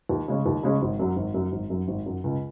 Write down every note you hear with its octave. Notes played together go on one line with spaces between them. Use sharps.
D#2
C#3 G#3 C#4
D#2
C#3 G#3 C#4
G#1
F#2 F#3
G#1
F#2 F#3
G#1
F#2 F#3
G#1
F#2 F#3
C#2